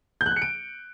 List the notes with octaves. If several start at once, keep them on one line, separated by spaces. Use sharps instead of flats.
G6
F#6
G6
C#7
D7